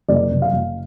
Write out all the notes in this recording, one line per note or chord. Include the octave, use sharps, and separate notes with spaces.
F#1 D5
F#1
F5
F#1